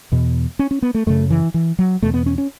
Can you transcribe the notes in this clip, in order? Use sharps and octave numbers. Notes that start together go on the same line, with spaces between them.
E2 B2
C#4
C#4
B3
A3
F#2 C#3 A3
E3
E3
F#3
E2 B2 A3
B3
C#4
C#4